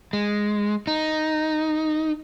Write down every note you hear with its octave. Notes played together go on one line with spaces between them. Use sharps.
G#3
D#4